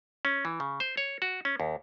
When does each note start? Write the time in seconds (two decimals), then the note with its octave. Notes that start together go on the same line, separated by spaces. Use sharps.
0.25 C#4
0.45 E3
0.60 C#3
0.80 C5
0.97 C#5
1.22 F#4
1.45 C#4
1.60 D#2